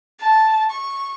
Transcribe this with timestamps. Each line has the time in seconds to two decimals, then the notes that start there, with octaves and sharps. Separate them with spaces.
0.20 A5
0.70 C#6